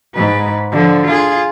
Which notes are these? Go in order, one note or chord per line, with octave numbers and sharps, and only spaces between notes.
G#2 B4
D3 F3
F4 G#4